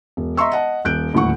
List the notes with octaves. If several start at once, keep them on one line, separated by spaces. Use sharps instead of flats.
E1
D#5 E5 A#5 C6 C#6 E6
D#5 F#5 A5
D#1 F#6 G6 D7
D#1 D2 A2 F#5 C#6